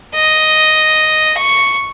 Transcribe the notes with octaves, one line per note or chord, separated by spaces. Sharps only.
D#5
C#6